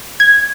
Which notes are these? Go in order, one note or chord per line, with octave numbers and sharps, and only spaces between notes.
G#6